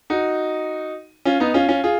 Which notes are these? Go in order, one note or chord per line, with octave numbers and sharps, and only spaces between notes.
D#4 F#4
C#4 F4
B3 D#4
C#4 F4
C#4 F4
F4 G#4